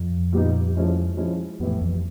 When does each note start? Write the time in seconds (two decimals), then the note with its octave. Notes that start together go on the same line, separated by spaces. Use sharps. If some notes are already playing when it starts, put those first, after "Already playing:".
Already playing: F2
0.33 A#2 G3 B3 D#4
0.75 F3 G#3 C#4 E4
1.17 F3 G#3 C#4 E4
1.60 F2 A2 E3 G3 B3
1.81 F2